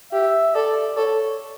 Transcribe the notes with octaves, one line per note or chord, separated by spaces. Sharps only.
G4 E5
A4 D5
A4 C#5